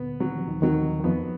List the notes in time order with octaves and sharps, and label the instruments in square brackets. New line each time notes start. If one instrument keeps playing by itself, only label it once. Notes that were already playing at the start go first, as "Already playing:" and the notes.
Already playing: [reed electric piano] D2 A#2 D3 [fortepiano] B3
[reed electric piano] D#3 [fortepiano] F#3
[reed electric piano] F3
D#2 D#3
[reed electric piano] D#2 D#3 [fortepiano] F#3
[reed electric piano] D#3
[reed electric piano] F2 F3 [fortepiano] B3